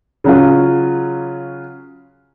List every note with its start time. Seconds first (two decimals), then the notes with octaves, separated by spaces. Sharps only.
0.24 C#3 F#3 C#4 F4